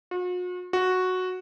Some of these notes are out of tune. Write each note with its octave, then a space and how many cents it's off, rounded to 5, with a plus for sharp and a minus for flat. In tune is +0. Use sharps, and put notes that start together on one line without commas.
F#4 -45
F#4 -5